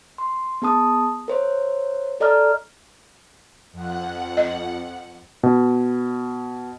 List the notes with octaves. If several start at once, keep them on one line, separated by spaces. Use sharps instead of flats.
C6
B3 G#4 A5 D#6
A#4 C5 C#5
A4 D5 D#5 A#5 F6
F2 F#5
D#5
B2